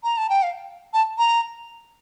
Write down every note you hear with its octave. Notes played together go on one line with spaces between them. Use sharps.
A#5
A5
G5
F5
A5
A#5